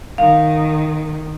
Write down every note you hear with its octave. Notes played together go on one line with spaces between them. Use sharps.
D#3 F5